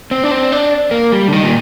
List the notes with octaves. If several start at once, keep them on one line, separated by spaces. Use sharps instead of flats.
C4
D4
C4
D4
A#3
G3
D3
D#3
A#2